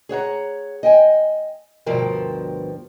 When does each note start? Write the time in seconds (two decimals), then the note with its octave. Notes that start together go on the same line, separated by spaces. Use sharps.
0.09 G#4 C#5 F#5 A#5
0.83 D#5 G5 G#5
1.86 D2 G2 B2 F3 A#4 G5